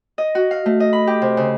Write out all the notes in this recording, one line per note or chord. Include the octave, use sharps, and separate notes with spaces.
D#5
F#4
F5
A3
D#5
B5
G4
C3
C#3